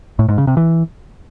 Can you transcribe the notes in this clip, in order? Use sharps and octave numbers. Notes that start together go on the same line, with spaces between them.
A2
G#2
C#3
C3
E3